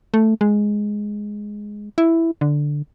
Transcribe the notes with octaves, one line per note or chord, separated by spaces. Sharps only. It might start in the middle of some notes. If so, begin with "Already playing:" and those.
A3
G#3
E4
D3